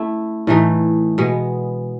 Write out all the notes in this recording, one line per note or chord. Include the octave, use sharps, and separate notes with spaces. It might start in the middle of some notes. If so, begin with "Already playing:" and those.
Already playing: A3 C#4 E4
A2 E3 A3 D#4
B2 G#3 B3